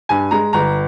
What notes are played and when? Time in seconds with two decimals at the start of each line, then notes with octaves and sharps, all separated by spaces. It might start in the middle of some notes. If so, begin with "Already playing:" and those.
0.09 G2 G#5
0.31 G#3 A#5
0.53 G1 A#5